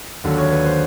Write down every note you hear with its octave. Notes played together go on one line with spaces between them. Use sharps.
D#2 D3 F#3
C#5
B4
C5